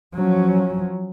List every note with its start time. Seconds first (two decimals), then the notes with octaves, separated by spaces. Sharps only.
0.14 F3 F#3 C#4